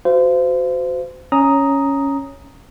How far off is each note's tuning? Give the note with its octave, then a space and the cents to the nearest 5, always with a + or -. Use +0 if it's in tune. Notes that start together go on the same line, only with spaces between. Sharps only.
F#4 +0 C5 -30 F5 -35
C#4 +0 A#5 +0 D#6 +5